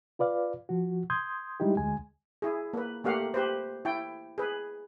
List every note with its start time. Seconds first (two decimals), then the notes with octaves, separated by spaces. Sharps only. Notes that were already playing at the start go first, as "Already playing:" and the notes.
0.19 F4 B4 D5 F5
0.69 F3 F#4
1.10 C6 D#6 G6 G#6
1.60 G3 G#3 D#4 E4 G4
1.77 D2 G#3 G#5
2.42 E4 G#4
2.73 A#3 B4
3.04 A3 A#3 G4 F5 F#5
3.34 G4 B4 C5
3.85 E4 G5
4.38 G#4 B4